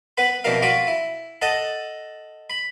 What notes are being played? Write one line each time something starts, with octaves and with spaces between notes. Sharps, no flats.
B3 B4 F#5 B5
F2 B2 D4 E4 A#4 F5
F4 F#4 B5 C#6 D6
E4
A4 D#5 F#5 A5
B5